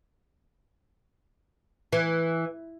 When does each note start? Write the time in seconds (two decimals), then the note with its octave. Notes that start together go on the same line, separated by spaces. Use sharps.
1.93 E3